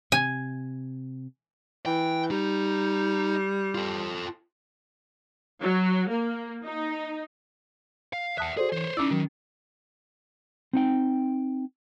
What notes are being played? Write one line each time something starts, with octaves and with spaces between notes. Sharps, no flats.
C3 G#5
E3 G5
G3 D#4
F4 A4
F#3
A#3
D#4
F5
E2 E5 F#5 A5 D#6 F#6
F#4 G#4 A4 C5 D5
E3 C5 C#5
C#4 D#4 E4 D5 D6 E6
D#3 F#3
C4 D#4 G5